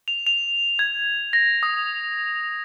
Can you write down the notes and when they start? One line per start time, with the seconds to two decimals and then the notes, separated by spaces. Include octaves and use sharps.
0.08 F7
0.27 F7
0.79 G#6
1.33 A#6
1.63 D#6